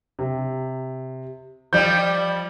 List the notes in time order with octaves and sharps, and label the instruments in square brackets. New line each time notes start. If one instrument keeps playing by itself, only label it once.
[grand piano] C3
[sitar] F3 G3 [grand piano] G6